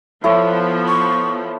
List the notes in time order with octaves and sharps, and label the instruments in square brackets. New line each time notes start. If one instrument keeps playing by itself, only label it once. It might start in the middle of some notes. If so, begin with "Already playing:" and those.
[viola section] F3 B3 [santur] E4 A4 C#5
[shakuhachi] C#6